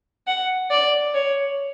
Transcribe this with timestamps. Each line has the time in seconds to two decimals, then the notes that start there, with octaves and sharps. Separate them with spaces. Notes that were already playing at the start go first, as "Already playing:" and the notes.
0.27 F#5
0.71 D5
1.15 C#5